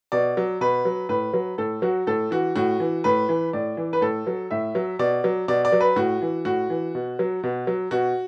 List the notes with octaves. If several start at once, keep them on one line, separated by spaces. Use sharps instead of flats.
B2 D5
F#3
B2 B4
F#3
A2 B4
F#3
A2 A4
F#3 F#4
A2 A4
E3 F#4
A2 F#4
E3
A2 B4
E3
A2 D5
E3
B4
A2 A4
F#3
A2 E5
F#3
B2 D5
F#3
B2 D5
D5
F#3
B4
A2 F#4
E3
A2 F#4
E3
B2
F#3
B2
F#3
B2 F#4